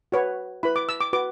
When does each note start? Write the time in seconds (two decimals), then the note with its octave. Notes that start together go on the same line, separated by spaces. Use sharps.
0.12 F#4 B4 C#5
0.63 E4 B4 B5
0.76 D6
0.89 E6
1.01 D6
1.13 F#4 B4 D6